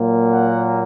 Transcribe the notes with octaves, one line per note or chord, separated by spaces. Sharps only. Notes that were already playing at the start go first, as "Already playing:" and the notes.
Already playing: A#2 F#3 A#3
F#5